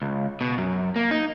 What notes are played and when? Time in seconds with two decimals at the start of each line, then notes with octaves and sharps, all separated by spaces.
0.02 C#2
0.41 B2
0.58 F#2
0.96 A#3
1.11 D#4